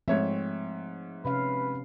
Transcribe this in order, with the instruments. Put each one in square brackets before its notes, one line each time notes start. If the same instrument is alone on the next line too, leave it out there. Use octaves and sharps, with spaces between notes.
[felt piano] G#2 C#5 E5 [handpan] F3 A3 C4
[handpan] C3 C#4 F5 [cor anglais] B4